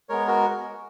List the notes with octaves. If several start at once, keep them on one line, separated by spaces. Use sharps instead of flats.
G#3 B3 A#4 C#5
F#4 A#4